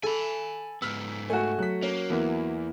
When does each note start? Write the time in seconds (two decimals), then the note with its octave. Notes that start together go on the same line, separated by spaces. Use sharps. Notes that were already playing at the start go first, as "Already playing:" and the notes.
0.03 A4 G#5 B5
0.82 G#2 B3 E6 F6 B6
1.30 A3 F#4 G#5
1.59 F#3 F#6 B6
1.82 A#3 C#4
2.10 E2 E3 A#3 B3 E4